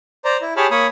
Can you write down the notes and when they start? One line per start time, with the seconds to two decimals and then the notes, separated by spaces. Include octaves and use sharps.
0.25 C5 D5 A#5
0.42 E4
0.57 G4 G#4 C#5 A5 B5 F6
0.71 A#3 C#5 B5 D#6